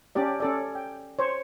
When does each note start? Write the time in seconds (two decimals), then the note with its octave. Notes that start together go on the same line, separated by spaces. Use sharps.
0.15 C#4 D4 G4 D5
0.40 C#4 A4 D5
0.75 G5
1.19 C5 C#5